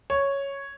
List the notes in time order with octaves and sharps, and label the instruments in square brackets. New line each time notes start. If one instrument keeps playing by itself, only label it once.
[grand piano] C#5